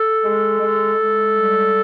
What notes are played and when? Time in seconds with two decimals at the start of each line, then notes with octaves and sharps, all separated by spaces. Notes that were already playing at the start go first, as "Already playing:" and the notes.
Already playing: A4
0.23 G#3
0.60 G#3
0.97 G#3
1.33 G3